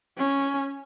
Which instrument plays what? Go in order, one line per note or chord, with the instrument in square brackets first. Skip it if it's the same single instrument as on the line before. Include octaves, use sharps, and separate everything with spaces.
[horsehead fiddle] C#4